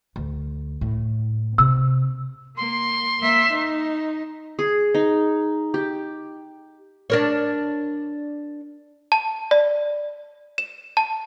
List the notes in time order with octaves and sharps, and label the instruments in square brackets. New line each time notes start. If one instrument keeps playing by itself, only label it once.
[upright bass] D2
A2
[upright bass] C3 C4 [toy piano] E6
[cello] A#3 [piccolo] C6
[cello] A#3 E5
D#4
[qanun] G#4
D#4
G4
[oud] D4 A#4 C#5
[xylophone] A5
D5
E7
A5